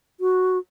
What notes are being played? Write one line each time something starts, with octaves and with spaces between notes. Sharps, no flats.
F#4